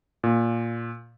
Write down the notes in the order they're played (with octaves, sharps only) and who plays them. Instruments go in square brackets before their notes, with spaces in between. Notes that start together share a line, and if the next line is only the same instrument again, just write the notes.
[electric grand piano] A#2